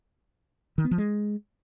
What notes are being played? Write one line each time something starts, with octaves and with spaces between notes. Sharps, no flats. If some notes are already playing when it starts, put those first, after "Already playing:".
D#3
B3
F3
G#3